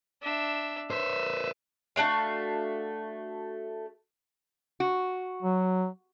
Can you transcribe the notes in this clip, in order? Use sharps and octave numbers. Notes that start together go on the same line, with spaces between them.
D4 E5
B4 C5 E5
A3 D4 F#4 F5
F#4
F#3